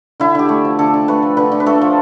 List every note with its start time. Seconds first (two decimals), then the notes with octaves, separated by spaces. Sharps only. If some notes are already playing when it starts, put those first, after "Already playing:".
0.20 D3 E4
0.35 D3 G4
0.49 A3
0.65 F3
0.79 D3 A4
0.94 D3
1.08 A3 B4
1.22 F3
1.37 D3 B4
1.52 D3
1.60 B4
1.66 A3 A4
1.81 F3